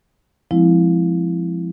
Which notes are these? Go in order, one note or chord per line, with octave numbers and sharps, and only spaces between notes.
F3 G#3 C4 E4